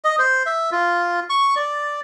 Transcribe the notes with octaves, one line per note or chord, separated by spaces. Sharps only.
D#5
C5
E5
F4
C#6
D5